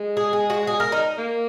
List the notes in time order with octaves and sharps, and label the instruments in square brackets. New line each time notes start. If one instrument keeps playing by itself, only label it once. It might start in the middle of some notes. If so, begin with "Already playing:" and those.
Already playing: [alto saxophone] G#3
[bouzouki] G#4
G#4
F#4
G#4
A#4
D#4
[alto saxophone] A#3